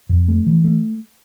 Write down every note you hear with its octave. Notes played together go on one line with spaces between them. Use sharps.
F2
A3
E3
A3